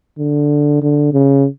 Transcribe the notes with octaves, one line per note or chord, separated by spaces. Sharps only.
D3
D3
C#3